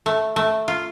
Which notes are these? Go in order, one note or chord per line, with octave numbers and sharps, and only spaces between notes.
A3
A3
F4